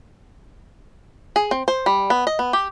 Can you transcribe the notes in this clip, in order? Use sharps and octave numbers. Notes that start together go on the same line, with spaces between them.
G#4
C4
C5
G3
B3
D#5
B3
G4